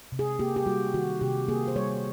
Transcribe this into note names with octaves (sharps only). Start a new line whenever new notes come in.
C3
G#4
A#3 G4
G4
G3 F#4
D#3 F#4
C3 G4
A#3 G#4
C5
G3 C#5